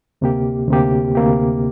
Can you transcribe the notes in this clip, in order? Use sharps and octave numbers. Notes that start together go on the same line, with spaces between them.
D2 C3 A#3 G4
D2 C3 A#3 G4
D2 C3 A#3 G4